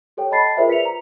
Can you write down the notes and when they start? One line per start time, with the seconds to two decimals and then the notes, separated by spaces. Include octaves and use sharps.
0.17 G4 A4 C#5 G5
0.31 D#5 G5 A5 B5 A6 C7
0.57 F4 G#4 A#4 C5 D5 E5
0.68 B4 B6 C#7 F7
0.85 A#5